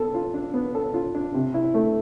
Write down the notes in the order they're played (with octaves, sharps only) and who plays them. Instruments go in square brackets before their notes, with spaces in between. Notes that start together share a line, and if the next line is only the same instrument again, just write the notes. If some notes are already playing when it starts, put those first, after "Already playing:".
Already playing: [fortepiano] B3 A4
F4
D4
B3
A4
F4
D4
C3
E4
A3